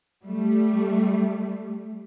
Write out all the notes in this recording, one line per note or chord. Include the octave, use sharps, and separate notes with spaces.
G3 A3